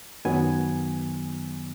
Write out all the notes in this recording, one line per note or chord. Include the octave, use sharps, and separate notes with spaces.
F#2 D#3 F#3 B3 G#5